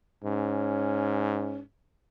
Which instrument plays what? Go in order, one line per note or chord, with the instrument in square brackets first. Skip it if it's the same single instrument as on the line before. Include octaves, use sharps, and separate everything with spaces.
[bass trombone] G#2 [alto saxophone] C#4